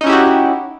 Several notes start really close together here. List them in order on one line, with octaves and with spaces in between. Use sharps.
D#4 C#4 E4 G4 F#4